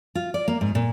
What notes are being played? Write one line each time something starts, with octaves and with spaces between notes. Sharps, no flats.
F4
D5
A#3
G#2
A#2